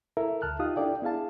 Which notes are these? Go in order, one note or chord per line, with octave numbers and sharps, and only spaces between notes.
E4 A4 A#4 E5
D2 A5 F6 F#6
D#4 F4 G4 F5 D#6
D4 E4 A4 D5 G5
B3 E4 G#4 F5 A5